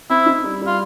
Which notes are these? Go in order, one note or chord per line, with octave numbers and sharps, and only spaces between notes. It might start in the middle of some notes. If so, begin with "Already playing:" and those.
C4 E4
D#4
G3
G3
F4